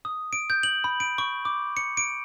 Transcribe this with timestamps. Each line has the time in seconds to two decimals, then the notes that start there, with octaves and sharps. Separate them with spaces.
0.05 D#6
0.33 D7
0.50 G6
0.63 F#7
0.84 B5
1.00 D7
1.18 C#6
1.45 D6
1.77 C#7
1.97 D7